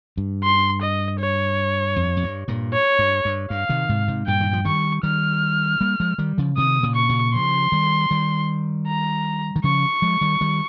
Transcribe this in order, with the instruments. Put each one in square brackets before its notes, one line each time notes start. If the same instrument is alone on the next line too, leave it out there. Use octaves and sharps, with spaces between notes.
[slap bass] G2
[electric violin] C6
D#5
C#5
[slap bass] F2
F2
G2
G2 A#2
[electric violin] C#5
[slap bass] G2
G2
[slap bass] G2 [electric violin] F5
[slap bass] C3 D#3
G#2 C3
G#2 C3
[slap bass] G2 A#2 [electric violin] G5
[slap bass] D#3
F3
[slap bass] D#3 G3 [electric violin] C#6
[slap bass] D#3 G3 [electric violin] F6
[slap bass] G3 A#3
F3 G#3
D#3 G3
C#3 F3
[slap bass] C3 D#3 [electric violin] D#6
[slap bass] A#2 C#3
[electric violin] C#6
[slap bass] A#2 C#3
[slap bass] C#3 F3 [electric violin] C6
[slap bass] D#3 G3
D#3 G3
[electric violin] A#5
[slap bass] D#3
[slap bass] C#3 F3 [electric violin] C#6
[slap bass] F3 G#3
D#3 G3
D#3 G3